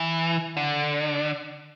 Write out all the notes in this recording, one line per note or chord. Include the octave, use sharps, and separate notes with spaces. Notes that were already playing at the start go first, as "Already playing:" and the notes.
Already playing: E3
D3